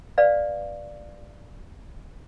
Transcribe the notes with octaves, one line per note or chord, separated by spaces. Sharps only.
B4 D5 F5